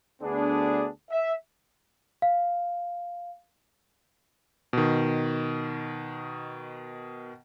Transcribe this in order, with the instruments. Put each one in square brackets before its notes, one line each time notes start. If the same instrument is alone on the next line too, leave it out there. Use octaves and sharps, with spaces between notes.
[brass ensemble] D2 B3 D4 G#4
E5
[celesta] F5
[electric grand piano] B2 D#3